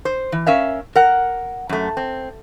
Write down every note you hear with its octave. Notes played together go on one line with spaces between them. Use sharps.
C5
E3
C#4 A#4 E5 F5
A#4 F#5
F#2 A3
C4